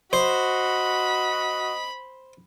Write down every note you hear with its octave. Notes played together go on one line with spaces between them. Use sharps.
F#4 C5 D#5 B5